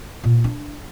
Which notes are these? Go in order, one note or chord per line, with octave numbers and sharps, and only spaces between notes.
A#2
D4